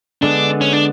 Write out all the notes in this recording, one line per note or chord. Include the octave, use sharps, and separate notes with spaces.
D3 G#3 B3 D4
C#4
D4